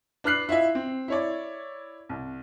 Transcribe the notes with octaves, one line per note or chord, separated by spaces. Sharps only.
D4 B4 F6 F#6 C7 F#7
E4 F4 D#5 E5
C4
E4 C#5 D5
C2